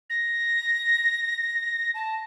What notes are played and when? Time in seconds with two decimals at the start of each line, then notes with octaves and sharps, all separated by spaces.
0.09 A#6
1.94 A5